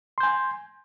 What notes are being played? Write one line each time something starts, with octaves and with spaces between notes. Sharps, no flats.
G#5 C6 G6